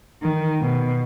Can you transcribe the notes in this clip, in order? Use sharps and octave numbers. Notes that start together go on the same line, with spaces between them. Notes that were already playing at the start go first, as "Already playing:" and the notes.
D#3
B2